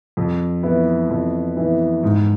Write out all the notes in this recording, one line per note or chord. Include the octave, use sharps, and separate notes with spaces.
F2
E3 B3 E4
F2
E3 B3 E4
G#2